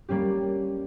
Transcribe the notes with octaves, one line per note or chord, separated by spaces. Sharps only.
G3 A#3 C#4 G4